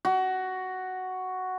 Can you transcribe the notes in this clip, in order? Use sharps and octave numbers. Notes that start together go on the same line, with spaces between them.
F#4